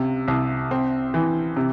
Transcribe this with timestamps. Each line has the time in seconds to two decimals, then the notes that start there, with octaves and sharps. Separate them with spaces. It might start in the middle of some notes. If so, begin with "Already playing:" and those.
Already playing: C#2 C3
0.28 C2
0.71 C4
1.14 E3
1.56 C3